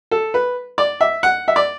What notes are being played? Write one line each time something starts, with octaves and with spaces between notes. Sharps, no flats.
A4
B4
D5
E5
F#5
E5
D5